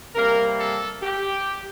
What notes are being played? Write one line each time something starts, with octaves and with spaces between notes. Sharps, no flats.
C3 G3 A#3 A#4
A4
G4